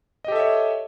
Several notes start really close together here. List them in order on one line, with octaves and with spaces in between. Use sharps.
D#5 G4 A4 E5 C#5